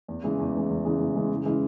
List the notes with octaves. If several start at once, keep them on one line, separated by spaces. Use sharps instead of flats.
E2
C#3 E3 G#3
E2
C#3 E3 G#3
E2
C#3 E3 G#3
E2
C#3 E3 G#3
C#3
E3 G#3 C#4 E4